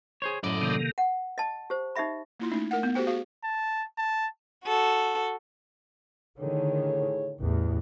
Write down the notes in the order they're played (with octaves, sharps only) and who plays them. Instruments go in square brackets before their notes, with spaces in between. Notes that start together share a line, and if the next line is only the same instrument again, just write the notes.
[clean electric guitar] G#4 C5 C#5
[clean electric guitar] F#2 [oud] A2 [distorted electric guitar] D5 D#5
[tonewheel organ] C3 D#3 A#3
[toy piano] F#5
D#5 A5
G4 C5
D#4 G4 D#5 E5 B5
[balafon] A#3 E4 F4
A3 C#4 D#4
A3 A#4 F#5
B3
F#4 G4 A4 C5 G5
F#4 G#4 F5
[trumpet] A5
A5
[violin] F#4 A4
[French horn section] A2 G#4 C#5 [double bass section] D3 D#3
[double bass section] A1 E2